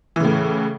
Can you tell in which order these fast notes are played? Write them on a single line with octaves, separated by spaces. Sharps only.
E3 C#3 A2